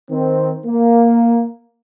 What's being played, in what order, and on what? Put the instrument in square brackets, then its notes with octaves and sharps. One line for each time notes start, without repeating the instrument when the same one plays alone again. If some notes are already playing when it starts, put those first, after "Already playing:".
[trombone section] D#3 C4
A#3